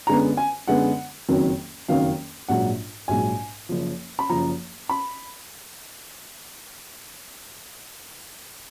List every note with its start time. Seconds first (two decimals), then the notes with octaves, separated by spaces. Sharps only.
0.07 F#2 D3 G#3 B3 A#5
0.37 G#5
0.67 F#2 D3 G#3 B3 F#5
1.29 F#1 F2 D#3 F#3
1.88 F#1 F2 D#3 F#3 F5
2.49 A#1 G#2 F#3 F#5
3.08 A#1 G#2 F#3 G#5
3.69 F#1 F#2 F3
4.19 B5
4.29 F#1 F#2 F3 A#5
4.89 B5